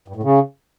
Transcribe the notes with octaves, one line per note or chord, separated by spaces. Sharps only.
G2
A2
C#3